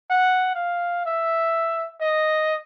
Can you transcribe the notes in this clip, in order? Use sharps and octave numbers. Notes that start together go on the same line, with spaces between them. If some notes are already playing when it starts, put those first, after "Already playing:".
F#5
F5
E5
D#5